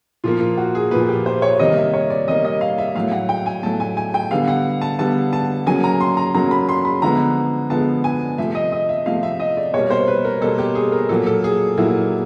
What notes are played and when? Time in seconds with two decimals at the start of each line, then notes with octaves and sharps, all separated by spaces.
0.24 A#2 F3 A#3 F4
0.40 F4
0.57 F#4
0.75 G#4
0.91 A#2 F3 A#3 B4
1.09 G4
1.26 C5
1.42 C#5
1.59 C3 D#3 G3 A#3 D#5
1.77 E5
1.93 C#5
2.10 D5
2.27 C3 D#3 G3 A#3 D#5
2.45 D#5
2.61 F5
2.78 E5
2.95 A2 F#3 A3 F5
3.12 F#5
3.29 G5
3.46 G#5
3.63 A2 F#3 A3 A5
3.80 G#5
3.97 G#5
4.14 G5
4.31 D3 G3 B3 F5
4.48 F#5
4.81 A5
4.99 D3 G3 B3 A5
5.33 A5
5.67 C#3 F#3 A#3 G#5
5.84 A#5
6.00 C6
6.17 A#5
6.34 C#3 F#3 A#3 A#5
6.51 B5
6.69 C6
6.85 B5
7.02 D3 F3 G#3 B3 A#5
7.70 D3 F3 G#3 B3 A5
8.04 G#5
8.38 C3 F3 A3 E5
8.55 D#5
8.72 D#5
8.89 E5
9.06 C3 F3 A3 F5
9.23 E5
9.40 D#5
9.57 D5
9.74 B2 G3 A#3 C#5
9.90 C5
10.08 B4
10.25 A#4
10.41 B2 G3 A#3 A4
10.58 G4
10.75 G#4
10.92 A#4
11.09 A#2 F#3 A#3 A4
11.26 A4
11.44 G#4
11.77 A#2 F#3 A#3 E4